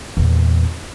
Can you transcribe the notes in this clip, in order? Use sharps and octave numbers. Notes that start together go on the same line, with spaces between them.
E2 A#2